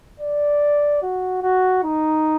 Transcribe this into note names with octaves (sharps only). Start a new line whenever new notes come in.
D5
F#4
F#4
D#4